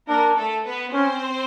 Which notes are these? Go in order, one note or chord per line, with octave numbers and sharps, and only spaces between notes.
A#3 D4 A#4
A3 A4
B3 B4
C4 C#4 C5